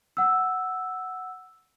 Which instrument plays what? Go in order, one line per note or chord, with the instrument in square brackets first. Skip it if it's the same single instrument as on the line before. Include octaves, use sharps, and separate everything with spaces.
[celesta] F#5 E6